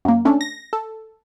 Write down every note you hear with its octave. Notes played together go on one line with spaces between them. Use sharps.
F#2 A#3
A3 C#4 D4 A4
A#6
A4